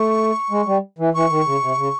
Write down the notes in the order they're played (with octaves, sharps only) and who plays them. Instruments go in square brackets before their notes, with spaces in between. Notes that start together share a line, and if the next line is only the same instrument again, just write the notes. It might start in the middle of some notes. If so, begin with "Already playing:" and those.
Already playing: [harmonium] A3 [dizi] C#6
[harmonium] G#3
G3
E3
[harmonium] E3 [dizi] C#6
[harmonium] D#3
C#3
C3
C#3